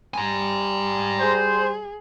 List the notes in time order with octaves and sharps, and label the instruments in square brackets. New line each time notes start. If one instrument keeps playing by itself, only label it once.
[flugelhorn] G3 [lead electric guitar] G#5 A#5
[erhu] G#4 [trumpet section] C5